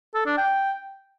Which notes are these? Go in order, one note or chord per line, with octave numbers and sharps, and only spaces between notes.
A4
D4
G5